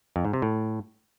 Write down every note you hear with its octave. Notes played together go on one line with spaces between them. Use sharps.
F2
G#2
C3
A2